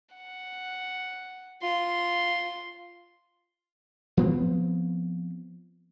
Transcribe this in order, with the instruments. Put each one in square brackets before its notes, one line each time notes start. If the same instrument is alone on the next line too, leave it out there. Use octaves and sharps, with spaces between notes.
[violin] F#5
[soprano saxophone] F4 [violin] C6
[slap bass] F3 B3 C4